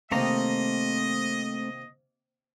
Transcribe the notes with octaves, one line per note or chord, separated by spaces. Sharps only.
C3 D#3 A3 A#3 C4 D#5 A#5